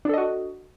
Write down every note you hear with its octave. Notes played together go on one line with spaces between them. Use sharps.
D4 F#4 A4 D#5